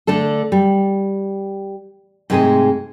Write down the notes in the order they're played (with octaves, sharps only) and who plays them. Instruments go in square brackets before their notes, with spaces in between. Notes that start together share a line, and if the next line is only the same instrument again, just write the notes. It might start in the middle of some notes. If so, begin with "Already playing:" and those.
[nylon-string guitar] D3 A3 D4 A4
G3
G#2 C3 G#3 A3 C5 D#5